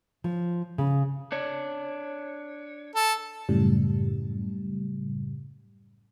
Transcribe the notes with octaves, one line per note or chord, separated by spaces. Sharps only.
F3
C#3
D4 C#5
A4
F#2 A2 C#3 G3